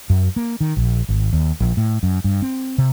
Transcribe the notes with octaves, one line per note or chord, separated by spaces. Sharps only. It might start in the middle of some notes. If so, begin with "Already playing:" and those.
F#2
A#3
D#3
A#1
G#1
D#2
A#1
A2
F#2
G2
C4
C3